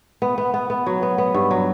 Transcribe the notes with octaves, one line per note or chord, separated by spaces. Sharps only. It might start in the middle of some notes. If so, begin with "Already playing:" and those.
B3
B3
B3
B3
F#3
B3
B3
G2
F#3